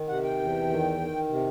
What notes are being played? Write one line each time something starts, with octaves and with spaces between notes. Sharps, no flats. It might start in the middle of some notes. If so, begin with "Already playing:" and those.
Already playing: D#3
C3 F#5
G5
E2
D#3
D#3
C3